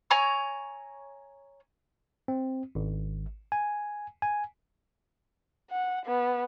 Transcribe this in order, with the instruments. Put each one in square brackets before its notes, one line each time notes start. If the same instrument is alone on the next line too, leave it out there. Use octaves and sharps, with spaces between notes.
[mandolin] C#5 G#5 A#5 E6
[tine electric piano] C4
G#1
G#5
G#5
[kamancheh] F#5
B3